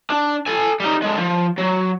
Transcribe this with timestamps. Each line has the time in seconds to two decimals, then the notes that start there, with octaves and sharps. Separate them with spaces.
0.10 D4
0.46 A4 G#5
0.80 G3 D#4
1.02 D3 G#3
1.18 F3
1.58 F#3